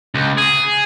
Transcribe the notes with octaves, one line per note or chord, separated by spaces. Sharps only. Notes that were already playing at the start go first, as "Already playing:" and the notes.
C#2
G#4